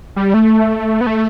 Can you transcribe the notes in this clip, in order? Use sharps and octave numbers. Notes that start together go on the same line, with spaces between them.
G3
A3
B3
A3